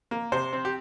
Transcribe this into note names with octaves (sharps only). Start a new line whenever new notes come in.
A#3
C3 C5
C4
G4